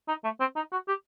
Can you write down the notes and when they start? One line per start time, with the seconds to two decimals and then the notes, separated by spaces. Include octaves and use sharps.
0.08 D#4
0.24 A3
0.40 C4
0.56 D#4
0.72 F#4
0.88 G4